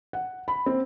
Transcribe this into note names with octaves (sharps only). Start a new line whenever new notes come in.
F#5
B5
C4